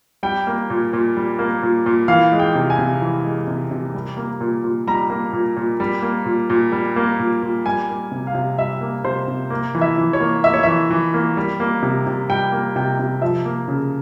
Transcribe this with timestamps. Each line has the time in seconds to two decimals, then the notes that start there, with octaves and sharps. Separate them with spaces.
0.23 G3 G5
0.47 A#3
0.70 A#2
0.93 A#2
1.17 G3
1.39 A#3
1.63 A#2
1.86 A#2
2.08 E3 F5
2.32 G#3
2.39 G5
2.55 C3
2.70 G#5
2.79 C3
3.01 E3
3.24 G#3
3.48 C3
3.71 C3
3.94 G3
4.17 A#3
4.41 A#2
4.64 A#2
4.87 G3 A#5
5.10 A#3
5.33 A#2
5.57 A#2
5.80 G3
6.02 A#3
6.26 A#2
6.50 A#2
6.72 G3
6.96 A#3
7.20 A#2
7.43 A#2
7.66 G3 G#5
7.89 A#3
8.12 C3
8.27 F5
8.34 C3
8.58 G3 E5
8.81 A#3
9.04 C3 C5
9.28 C3
9.50 A#3
9.75 E3
9.81 E5
9.98 E3
10.13 C#5
10.20 A#3
10.44 A#3 E5
10.54 C#5
10.63 E3 E5
10.90 E3
11.14 A#3
11.37 G3
11.60 A#3
11.82 C3
12.07 C3
12.29 G3 G5
12.52 A#3
12.76 C3 G5
12.99 C3
13.22 F3 E5
13.45 A#3
13.68 C#3